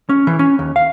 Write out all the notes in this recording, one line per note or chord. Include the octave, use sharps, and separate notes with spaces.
C#4
E3
C#4
D#2
F5